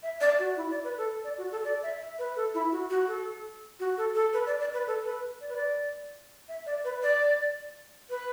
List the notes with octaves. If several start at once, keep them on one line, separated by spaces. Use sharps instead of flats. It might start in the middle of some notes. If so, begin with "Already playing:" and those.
E5
D5
F#4
E4
D5
B4
A4
D5
F#4
A4
D5
E5
E5
B4
A4
E4
F#4
F#4
A4
F#4
A4
A4
B4
D5
D5
B4
A4
B4
D5
B4
D5
E5
D5
B4
D5
B4